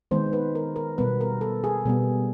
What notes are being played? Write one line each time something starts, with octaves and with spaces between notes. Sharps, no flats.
D#3 G#3 B3 C5
B4
A#4
A#4
B2 G3 B3 B4
A#4
A4
G#4
B2 G3 B3